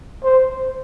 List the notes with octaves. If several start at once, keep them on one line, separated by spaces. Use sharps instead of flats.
C5